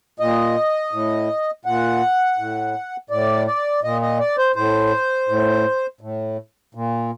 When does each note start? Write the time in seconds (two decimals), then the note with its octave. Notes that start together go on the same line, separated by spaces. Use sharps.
0.20 A#2 D#5
0.92 A2
1.65 A#2 F#5
2.38 A2
3.10 A2 D5
3.47 D5
3.83 A#2 D#5
4.02 D#5
4.20 D5
4.38 C5
4.56 A2 C5
5.29 A2
6.01 A2
6.75 A#2